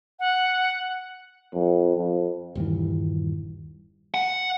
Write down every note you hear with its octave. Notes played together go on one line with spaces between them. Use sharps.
F#5
F2
F2
D#1 G2 D#3 E3
F#5